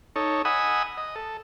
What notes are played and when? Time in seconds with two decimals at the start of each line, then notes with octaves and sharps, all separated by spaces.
0.16 D#4 A4 C#5
0.45 D#5 F#5 G#5 B5 D#6 E6
0.97 D#5
1.16 A4